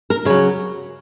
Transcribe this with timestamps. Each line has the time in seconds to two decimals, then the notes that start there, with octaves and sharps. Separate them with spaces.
0.10 A#4
0.25 C#3 F#3 C#5